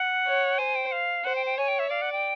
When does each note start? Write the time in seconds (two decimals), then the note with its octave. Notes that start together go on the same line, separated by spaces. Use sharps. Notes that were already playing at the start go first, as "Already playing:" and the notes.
Already playing: F#5
0.26 C#5
0.58 C5 G#5
0.75 G5
0.92 F5
1.24 C5 F#5
1.36 G5
1.46 G5
1.58 C#5 G#5
1.68 G5
1.79 E5
1.90 D5 F5
2.02 F#5
2.12 G5